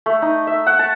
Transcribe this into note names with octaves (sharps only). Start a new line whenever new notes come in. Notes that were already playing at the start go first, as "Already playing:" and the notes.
A3
D#4
E5
F#5
A5